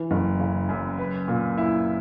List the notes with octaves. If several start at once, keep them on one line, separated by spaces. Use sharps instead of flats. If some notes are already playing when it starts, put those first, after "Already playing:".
Already playing: E3
F#1
C#3
F#2
B4
A#2
E4